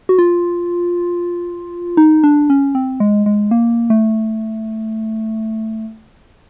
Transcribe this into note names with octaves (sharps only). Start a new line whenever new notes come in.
F#4
F4
D#4
D4
C#4
C4
G#3
G#3
A#3
A3